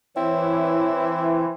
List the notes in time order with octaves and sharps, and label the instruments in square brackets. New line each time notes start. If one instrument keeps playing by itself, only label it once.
[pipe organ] E3 [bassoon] C4 [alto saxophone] E4 [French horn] C#5